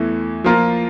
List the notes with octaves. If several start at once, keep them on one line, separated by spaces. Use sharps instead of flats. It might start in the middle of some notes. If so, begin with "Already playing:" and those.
Already playing: E2 E3 A3
F3 A#3 F4 A#4